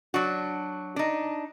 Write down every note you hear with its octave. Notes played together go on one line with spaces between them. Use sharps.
F#3 D4 F#4
D4 D#4